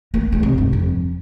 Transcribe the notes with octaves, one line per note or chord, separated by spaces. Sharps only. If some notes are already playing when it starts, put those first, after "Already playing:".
A#3
G#3
C3
G2
F2